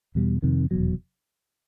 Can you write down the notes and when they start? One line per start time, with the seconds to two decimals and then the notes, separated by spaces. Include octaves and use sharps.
0.15 E2 B2 G3
0.42 F2 C3 D#3
0.71 F1 E2 B2 F#3